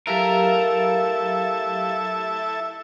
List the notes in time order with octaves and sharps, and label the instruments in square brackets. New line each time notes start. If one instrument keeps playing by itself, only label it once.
[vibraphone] F#3 G4 F5 [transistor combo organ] E4 A4 E5 [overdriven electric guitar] A#4